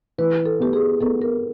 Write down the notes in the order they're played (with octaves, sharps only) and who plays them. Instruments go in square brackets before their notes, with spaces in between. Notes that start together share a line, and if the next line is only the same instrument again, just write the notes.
[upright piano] E3 [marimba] B4
[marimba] A4
[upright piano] B3 [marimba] G4
[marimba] G#4
[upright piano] B3 [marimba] A4
[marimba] A#4